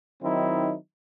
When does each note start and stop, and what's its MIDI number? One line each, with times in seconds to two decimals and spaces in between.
0.22 0.75 51
0.22 0.75 54
0.22 0.75 60
0.22 0.75 63
0.22 0.75 64